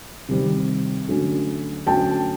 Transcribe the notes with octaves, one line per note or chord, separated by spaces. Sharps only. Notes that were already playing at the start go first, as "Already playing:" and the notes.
C3 D#3 G3 C4
D3 F#3 A3 C#4
D3 F#3 A3 C#4 G5 A5